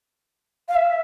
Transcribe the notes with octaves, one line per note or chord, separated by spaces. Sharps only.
F5
E5